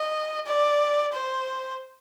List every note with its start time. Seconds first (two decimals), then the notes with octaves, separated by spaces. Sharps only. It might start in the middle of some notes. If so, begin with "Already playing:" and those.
Already playing: D#5
0.46 D5
1.13 C5